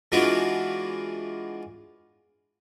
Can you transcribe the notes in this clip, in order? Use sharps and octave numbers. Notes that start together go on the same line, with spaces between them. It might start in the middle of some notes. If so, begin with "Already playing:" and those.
E3 G#3 B3 D4 F4 F#4